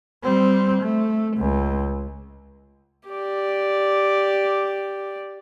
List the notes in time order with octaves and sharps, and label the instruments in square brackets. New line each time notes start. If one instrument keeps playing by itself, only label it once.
[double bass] G3 C4
A3
C#2
[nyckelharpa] G4 D5